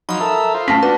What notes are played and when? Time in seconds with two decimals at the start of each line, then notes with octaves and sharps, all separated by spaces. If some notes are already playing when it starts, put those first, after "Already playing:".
0.09 F3 F#3 D#4 B5 D#6
0.20 A4 A#4 E5
0.54 F4 C5
0.68 A3 A#3 C#4 A5 A#6 B6
0.83 D4 F#4 B4